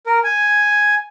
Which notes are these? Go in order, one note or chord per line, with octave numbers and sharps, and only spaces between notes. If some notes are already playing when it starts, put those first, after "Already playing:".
A#4
G#5